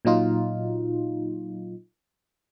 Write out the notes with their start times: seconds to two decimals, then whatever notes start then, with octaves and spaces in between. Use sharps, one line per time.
0.05 A#2 F#3 D#4 F4